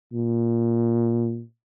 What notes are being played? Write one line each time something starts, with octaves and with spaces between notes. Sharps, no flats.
A#2